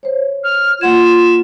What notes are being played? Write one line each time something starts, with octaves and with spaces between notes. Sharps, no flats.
C5 C#5
F6
A#3 F4 F#5 G#6 E7